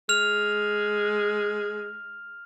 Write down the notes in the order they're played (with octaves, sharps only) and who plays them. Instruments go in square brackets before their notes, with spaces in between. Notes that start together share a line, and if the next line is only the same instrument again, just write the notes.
[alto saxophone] G#3 [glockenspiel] F6 F7